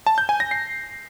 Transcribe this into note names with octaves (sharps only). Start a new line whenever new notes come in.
A5
G6
G#5
A#6
C7